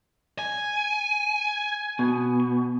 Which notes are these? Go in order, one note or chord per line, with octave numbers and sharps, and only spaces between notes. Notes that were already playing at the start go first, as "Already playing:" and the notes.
G#5
B2